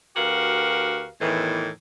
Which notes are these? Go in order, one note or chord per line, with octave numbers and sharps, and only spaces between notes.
D2 F#4 G4 A#4 B4 F5
E2 A2 D#3 E3